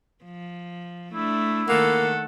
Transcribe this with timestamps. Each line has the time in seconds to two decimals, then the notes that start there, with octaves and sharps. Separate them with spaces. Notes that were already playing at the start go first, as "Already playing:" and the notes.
0.25 F3
1.14 A3 D4 E4
1.69 D#3 A3 A#3 A4 F#5